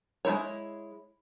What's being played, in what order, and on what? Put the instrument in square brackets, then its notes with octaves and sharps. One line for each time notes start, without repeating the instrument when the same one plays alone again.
[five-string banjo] G#3 D#4 E4 C#5